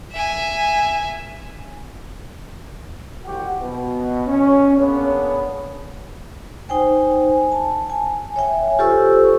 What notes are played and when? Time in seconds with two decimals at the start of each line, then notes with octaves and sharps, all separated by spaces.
0.12 E5 G#5
3.25 C2 F3 F#4 G4 F#5
3.59 B2
4.27 C#4
4.77 A#3 B3 D4 G#4 C#5
6.69 D#4 C5 G5 G#5
7.52 A5
7.90 G#5
8.36 C#5 E5 G5 G#5
8.79 F4 G4 A4 C5 C#6 E6